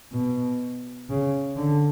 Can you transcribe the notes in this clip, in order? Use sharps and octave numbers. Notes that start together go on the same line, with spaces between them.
B2
C#3
D3